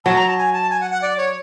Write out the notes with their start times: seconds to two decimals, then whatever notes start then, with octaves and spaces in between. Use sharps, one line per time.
0.05 F#3 A5
0.16 A#5
0.27 A5
0.38 G#5
0.53 A5
0.70 G#5
0.81 F#5
0.91 F#5
1.02 D5
1.18 C#5